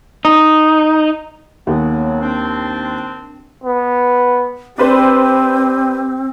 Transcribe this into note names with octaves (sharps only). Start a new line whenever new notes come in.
D#4
D#2 C#3 F#3 B3
C4 D4
B3
C4 D4 G4 B4 C5